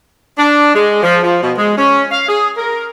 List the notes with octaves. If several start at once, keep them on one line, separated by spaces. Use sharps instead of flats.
D4
G#3
F3
F3
B2
G#3
C#4
F5
G#4
A#4